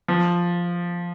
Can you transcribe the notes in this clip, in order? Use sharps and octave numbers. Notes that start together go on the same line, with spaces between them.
F3